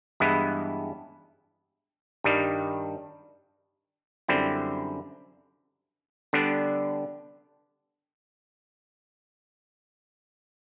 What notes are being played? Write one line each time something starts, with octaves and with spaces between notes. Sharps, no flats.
G2 E3 G#3 B3 E4
G2 D#3 G3
F#2 D3 G3 C4 E4
D3 G3 B3 D4